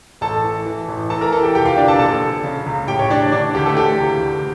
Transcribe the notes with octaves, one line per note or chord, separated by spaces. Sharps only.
A1 A4 A5
E3
E3
A1
E3 A4 A5
A#4 A#5
E3 A4 A5
G4 G5
F1 G4 G5
F4 F5
D3 D4 D5
A4 A5
A#1 A4 A5
A#1
C#3
C#2
A2 G4 G5
C#5
E3 D4 D5
D3 D4 D5
D2 G4
A3 A4
E3 G4
C#2
D2